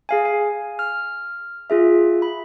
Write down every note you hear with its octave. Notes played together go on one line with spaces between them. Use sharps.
G#4 F5 G#5
G#5
F6
F4 G#4 E5
B5